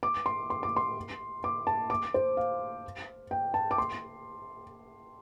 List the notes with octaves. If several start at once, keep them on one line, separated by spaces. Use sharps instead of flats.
D6
C6
C6
D6
C6
D6
A5
D6
C5
F5
G5
A5
D6
C6